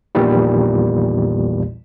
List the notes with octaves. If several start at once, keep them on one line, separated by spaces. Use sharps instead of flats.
A#1 E2 A#2 D#3 E3 G3